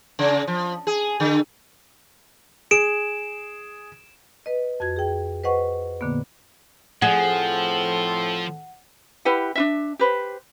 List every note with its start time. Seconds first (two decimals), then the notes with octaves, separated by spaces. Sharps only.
0.19 C#3
0.47 F3
0.87 G#4
1.20 D3
2.71 G#4 D7 E7
4.46 B4 D#5
4.80 F2 F#4 G#6
4.96 G#4 G5
5.44 B4 C5 D#5 F#5 C#6
6.01 A#2 D3 A#3 B3
7.02 A2 F3 C4 G#4 A4 F#5
9.25 E4 G4 B4 F#5
9.55 D4 F4 E5
9.99 G4 B4 C5